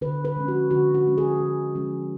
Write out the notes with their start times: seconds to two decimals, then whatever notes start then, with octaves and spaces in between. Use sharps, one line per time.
0.01 D3 B4
0.25 B4
0.36 F3 G#3 C#4
0.48 F#4
0.71 D3 F#4
0.94 F#4
1.06 F3 G#3 C#4
1.18 G#4
1.40 D3
1.75 F3 G#3 C#4